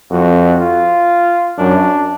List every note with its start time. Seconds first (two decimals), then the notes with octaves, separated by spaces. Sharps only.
0.11 F2 F#4
0.60 F4
1.58 F#2 D4